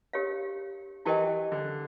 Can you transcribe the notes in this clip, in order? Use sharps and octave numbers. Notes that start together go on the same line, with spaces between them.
D4 G4 A#4 C#5 F5
E3 E4 G4 A#4 D#5 G5
D3